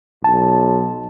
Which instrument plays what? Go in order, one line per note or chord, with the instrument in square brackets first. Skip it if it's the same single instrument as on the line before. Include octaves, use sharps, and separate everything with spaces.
[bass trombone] B1 [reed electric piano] A5